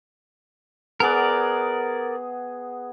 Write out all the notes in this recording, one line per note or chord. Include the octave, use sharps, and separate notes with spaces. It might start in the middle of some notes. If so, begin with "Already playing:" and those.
B3 G#4 A#4 D5 F#5